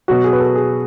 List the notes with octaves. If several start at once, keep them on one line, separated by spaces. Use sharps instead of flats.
B2 F#3 F#4
G#4
B4
A4
G#4